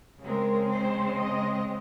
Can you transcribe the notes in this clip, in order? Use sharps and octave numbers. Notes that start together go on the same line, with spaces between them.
C#3 G#3 C4 A#4
C5
D#5